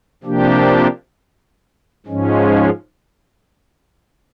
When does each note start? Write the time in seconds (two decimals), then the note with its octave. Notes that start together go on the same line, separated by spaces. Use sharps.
0.23 C3 F3 A#3 D4 G4
2.06 G#2 F3 G#3 C#4